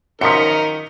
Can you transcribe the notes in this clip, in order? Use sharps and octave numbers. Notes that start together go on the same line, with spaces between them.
F#2 D#3 F3 D#4 A#4 B6 C#7